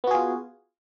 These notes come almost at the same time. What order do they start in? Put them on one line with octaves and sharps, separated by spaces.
B3 F#4 G#4 F4